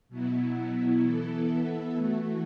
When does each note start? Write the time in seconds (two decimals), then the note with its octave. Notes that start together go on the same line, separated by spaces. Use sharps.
0.09 B2 F#3 B3 E4
1.02 E3 B3 E4 A4
1.96 E3 A3 F#4